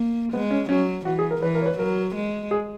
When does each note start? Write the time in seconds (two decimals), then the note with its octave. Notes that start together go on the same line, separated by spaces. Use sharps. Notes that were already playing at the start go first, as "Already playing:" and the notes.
Already playing: A#3
0.33 G#3 B3
0.51 C#4
0.69 F#3 C#4
1.05 E3 F#4
1.19 G#4
1.31 A#4
1.42 E3 B4
1.55 A#4
1.62 C#5
1.66 B4
1.78 F#3 A#4
2.15 G#3
2.51 G#4